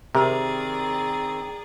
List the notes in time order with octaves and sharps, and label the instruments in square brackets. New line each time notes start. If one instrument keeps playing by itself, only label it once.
[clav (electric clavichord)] C3 [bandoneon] D#3 C4 [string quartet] G#4 D5 [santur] A#4